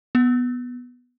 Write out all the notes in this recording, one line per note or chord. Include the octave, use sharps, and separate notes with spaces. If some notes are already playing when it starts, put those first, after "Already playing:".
B3